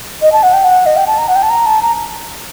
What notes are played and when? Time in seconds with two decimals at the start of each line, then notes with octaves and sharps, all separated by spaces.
0.22 D#5
0.32 A5
0.43 F#5
0.53 G5
0.64 F#5
0.86 D#5
0.97 G5
1.07 A5
1.18 A#5
1.28 F#5
1.36 G5
1.43 A5
1.50 A#5
1.66 A5
1.82 A#5